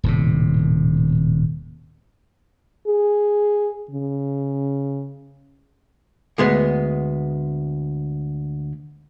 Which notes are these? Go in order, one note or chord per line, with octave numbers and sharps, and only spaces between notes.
D#1 A2 C3
G#4
C#3
D2 G#3 B3